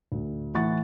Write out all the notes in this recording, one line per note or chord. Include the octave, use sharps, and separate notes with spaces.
D2
A2 E3 F#5 C#6 A6